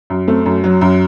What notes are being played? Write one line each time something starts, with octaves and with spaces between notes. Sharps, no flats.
F#2
A3 C4
F#2
F#3
F#2